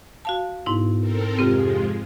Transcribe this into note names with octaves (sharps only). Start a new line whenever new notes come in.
F#4 F5 A5
G#2 B2 D#4 E4
C4 A4 A#4
F2 C3 F3 G#3 C4 F4